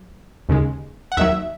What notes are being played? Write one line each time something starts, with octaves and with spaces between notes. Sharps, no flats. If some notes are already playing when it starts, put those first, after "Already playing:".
Already playing: F#3
D#2 C#3 G#3
F#5
D#2 D#3 F#3 E5